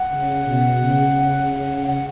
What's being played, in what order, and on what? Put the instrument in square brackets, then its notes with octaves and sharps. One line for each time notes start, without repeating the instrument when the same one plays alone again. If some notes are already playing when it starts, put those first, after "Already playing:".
Already playing: [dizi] F#5
[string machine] C#3
B2
C#3
[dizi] F#5